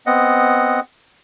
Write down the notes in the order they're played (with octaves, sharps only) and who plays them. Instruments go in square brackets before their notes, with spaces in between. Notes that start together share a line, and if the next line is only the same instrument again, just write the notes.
[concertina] B3 C4 D#5 F#5